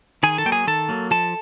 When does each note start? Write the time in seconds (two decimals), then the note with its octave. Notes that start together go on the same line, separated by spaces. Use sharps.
0.23 D#3 G#4 G#5
0.38 A4 A5
0.45 F#3 A#3 G5
0.52 G#4 G#5
0.67 D#3 A4 A5
0.89 F#3 A#3
1.11 F3 A4 A5